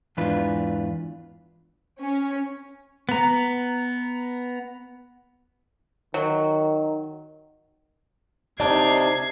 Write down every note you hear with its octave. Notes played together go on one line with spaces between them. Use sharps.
E2 G#2 E3 D4 F4 B4
C#4
B3 A#5
D#3 F#3
C3 D#4 D5 A5 G#6 C7